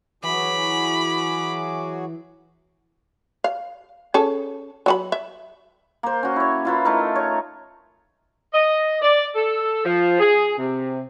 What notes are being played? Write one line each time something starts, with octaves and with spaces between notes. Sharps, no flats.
E3 F#3 F#4 G#4 B5 D6
F5
C#4 G#4 A4
F#3 F#4 B5
E5
A#3 C5
C#4 F#4
E4 C#5
E4 F4 B4
A3 D#4 A#4
C#5
D#5
D5
A4
F3
G#4
C3